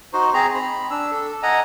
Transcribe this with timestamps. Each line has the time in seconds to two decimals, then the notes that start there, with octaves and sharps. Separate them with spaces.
0.13 D#4 F#4 C5
0.34 C4 G#4 A#5
0.54 B5
0.91 D4 E6
1.11 A4
1.43 D#5 F#5 G#5 A#5